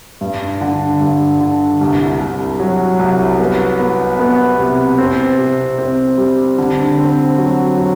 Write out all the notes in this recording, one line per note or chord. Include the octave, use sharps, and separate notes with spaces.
G2
D3
G2
D3
C2
C2
F#3
C2
B3
B3
B3
C3
C4
C3
C4
G3
D3
C4
F#3
F#3